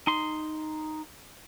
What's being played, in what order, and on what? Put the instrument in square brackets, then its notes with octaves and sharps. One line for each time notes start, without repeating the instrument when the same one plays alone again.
[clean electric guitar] D#4 C6